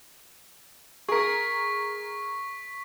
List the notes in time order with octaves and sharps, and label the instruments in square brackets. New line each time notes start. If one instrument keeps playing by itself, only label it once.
[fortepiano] G#4 A#4 [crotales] C#6 B6